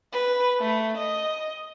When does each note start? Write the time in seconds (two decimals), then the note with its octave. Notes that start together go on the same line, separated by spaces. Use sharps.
0.11 B4
0.59 A3
0.97 D#5